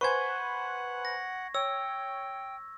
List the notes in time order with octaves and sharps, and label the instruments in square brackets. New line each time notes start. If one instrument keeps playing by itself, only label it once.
[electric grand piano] B4 C5 G#5 [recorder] F#5 [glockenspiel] C#6 G#6
[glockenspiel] A#6
[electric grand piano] C#5 [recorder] G5 [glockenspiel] E6